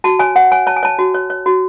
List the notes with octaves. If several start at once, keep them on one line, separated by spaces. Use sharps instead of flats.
F#4 A5
C#5 G#5
C#5 F#5
C#5 G#5
C#5 A5
G#5
C#5 A5
F#4
C#5
C#5
F#4